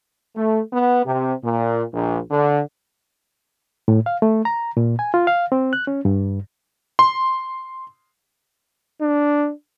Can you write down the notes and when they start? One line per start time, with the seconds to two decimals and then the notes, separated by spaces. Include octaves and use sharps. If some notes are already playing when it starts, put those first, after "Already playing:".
0.35 A3
0.73 B3
1.05 C3
1.43 A#2
1.93 A#1
2.31 D3
3.88 A2
4.06 F5
4.22 A3
4.45 A#5
4.77 A#2
4.99 G#5
5.14 F4
5.27 F5
5.52 C4
5.73 F#6
5.87 C#4
6.05 G2
6.99 C6
9.01 D4